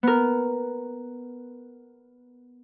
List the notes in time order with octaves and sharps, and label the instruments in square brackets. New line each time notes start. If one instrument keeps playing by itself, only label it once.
[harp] B3 A#4